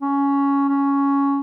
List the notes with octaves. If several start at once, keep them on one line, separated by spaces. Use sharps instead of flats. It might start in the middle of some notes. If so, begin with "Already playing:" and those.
C#4
C#4